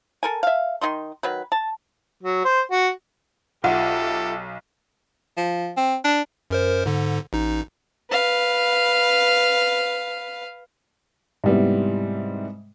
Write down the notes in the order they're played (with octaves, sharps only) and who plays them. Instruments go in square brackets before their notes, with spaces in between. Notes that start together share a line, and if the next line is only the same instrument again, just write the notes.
[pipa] A4 A#4 G#5
E5 F5
D#3 D#4 C6
D#3 F#3 B4
A5
[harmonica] F#3
C5
F#4
[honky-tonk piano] B1 [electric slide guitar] F4 E5 [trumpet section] G4 A4 [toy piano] F#5
[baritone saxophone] F3
C4
D4
[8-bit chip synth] F#2 A#4 C5
G#2 D3
A1 D#4
[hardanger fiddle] B4 F5
[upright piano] G#2 C3 G3 B3 E4